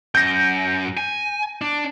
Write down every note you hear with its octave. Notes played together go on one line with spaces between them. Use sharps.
F#2 G6 A#6
G#5
D4